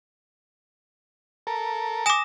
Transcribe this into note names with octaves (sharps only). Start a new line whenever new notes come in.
A4 A#4
G#5 D6 D#6 A#6 E7